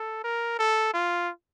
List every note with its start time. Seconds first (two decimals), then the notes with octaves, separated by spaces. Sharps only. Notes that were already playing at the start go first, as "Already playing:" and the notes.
Already playing: A4
0.24 A#4
0.59 A4
0.94 F4